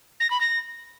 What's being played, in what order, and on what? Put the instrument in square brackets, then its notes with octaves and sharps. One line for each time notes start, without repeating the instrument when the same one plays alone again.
[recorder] A#6
B5
A#6